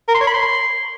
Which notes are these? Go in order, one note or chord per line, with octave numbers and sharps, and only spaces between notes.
A#4
C6
C#5
B5
C6